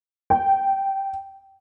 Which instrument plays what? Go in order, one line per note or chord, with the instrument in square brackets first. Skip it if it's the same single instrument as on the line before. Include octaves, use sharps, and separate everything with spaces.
[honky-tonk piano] G5